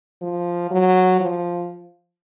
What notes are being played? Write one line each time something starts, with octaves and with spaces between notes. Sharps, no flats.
F3
F#3
F3